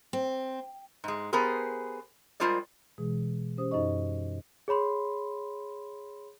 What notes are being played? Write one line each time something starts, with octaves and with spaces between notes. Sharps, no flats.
C4
G#2 G#3
B3 G4 G#4 A#4 C5
G3 G#3 F4 A#4 C5 D5
B2 E3 G#3 G#4
C#4 G4 C5 D#6
F#2 D#4 A4 C5 D#5 C#6
G#4 C#5 B5 C6